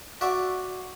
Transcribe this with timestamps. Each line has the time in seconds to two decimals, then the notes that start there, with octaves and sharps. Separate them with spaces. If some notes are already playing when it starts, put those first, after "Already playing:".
0.21 F#4 D5 E5